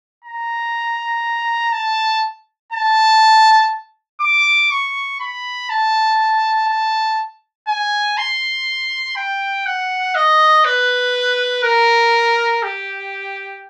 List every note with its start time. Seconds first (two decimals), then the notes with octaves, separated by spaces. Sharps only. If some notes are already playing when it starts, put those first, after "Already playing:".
0.24 A#5
1.72 A5
2.72 A5
4.21 D6
4.71 C#6
5.20 B5
5.69 A5
6.68 A5
7.67 G#5
8.17 C6
9.16 G5
9.66 F#5
10.15 D#5
10.65 B4
11.63 A#4
12.63 G4